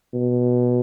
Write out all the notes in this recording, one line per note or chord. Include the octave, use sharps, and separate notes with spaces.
B2